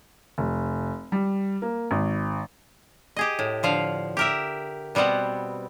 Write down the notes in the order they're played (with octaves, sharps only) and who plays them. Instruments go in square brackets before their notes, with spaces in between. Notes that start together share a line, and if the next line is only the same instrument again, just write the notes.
[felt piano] F1
G3
A#3
G#1
[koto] G4 G#4 D#5
A2
D3 F3 F5
G4 A#4 E5
B2 G3 B3 C4 F#5